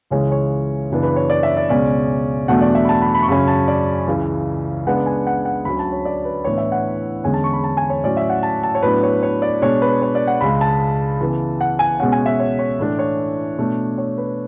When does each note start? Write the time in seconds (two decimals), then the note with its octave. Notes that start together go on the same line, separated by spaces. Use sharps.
0.11 C#2 C#3 E3 G#3 C#4 C#5
0.32 C#5
0.90 F#2 C#3 E3 B3 D4
1.03 B4
1.16 C#5
1.30 D5
1.43 E5
1.57 D5
1.69 C#2 B2 G#3 C#4 D5
2.48 E2 B2 F#3 A3 D4 F#5
2.61 D5
2.75 E5
2.85 B5
2.89 A5
3.02 B5
3.14 B5
3.23 C#6
3.27 F#2 C#3 F#3 C#4 B5
3.48 A5
3.68 D5
4.07 C#2 C#3 E3
4.86 C#3 G#3 B3 D4 F#5
5.06 G#5
5.27 F#5
5.45 F#5
5.65 D2 D3 F#3 C#4 B5
5.79 A5
5.92 C#5
6.05 D5
6.25 B4
6.45 A2 E3 B3 D4 C#5
6.58 E5
6.72 F#5
7.24 E2 D3 G#3 C#4 G#5
7.34 A5
7.44 C#6
7.53 B5
7.64 A5
7.77 G#5
7.90 C#5
8.04 A2 F#3 C#4 D5
8.17 E5
8.30 F#5
8.43 A5
8.63 A5
8.75 C#5
8.82 A2 F#3 B3 D4 B4
9.03 C#5
9.23 C#5
9.42 D5
9.62 B2 G#3 D4 C#5
9.82 B4
10.02 C#5
10.15 D5
10.27 F#5
10.41 C#2 C#3 G#3 B5
10.61 A5
11.21 C#3 E3 B3
11.61 F#5
11.79 G#5
12.00 B2 G#3 C#4 F#5
12.12 G#5
12.26 E5
12.40 C#5
12.59 C#5
12.79 A2 E3 A3 D4
12.99 C#5
13.58 B2 A3 D4
13.98 C#5
14.18 B4